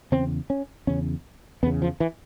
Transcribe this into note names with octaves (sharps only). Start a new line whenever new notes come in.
E2 C#3 C4
C#4
E2 C#3 C#4
E2 C#3 B3
F3
E3